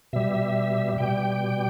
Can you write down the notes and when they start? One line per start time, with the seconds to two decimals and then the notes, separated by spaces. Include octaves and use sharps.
0.13 B2 G3 E5
0.98 B2 G3 G5